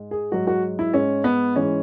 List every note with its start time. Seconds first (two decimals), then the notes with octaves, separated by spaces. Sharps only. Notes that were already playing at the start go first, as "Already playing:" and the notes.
Already playing: G#2 G#3
0.11 G#4
0.32 G#2 F#3 F#4
0.47 F#4
0.79 E4
0.94 G#2 G#3 C#4
1.24 B3
1.56 G#2 E3 G#3 C#4